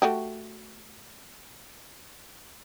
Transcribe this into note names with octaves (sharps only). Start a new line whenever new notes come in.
A3 F#4 G4